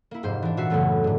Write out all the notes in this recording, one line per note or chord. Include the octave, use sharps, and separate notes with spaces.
A#3 E4
F1 G#2 C5
E3 D4
A#2 F#4 E5 C7
F#2 A2 C#3 F#3 A3 B3
G#2 D3